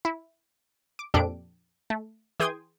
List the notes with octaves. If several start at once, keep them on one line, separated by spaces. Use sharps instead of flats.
E4
D6
F2 A#2 D4 G4 A4 D7
A3
E3 G#4 G5 C6 D#6 G#6